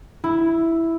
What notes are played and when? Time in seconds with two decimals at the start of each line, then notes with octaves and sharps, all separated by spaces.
0.24 E4